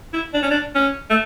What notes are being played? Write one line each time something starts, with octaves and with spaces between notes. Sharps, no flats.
E4
D4
C#4
D4
C#4
A3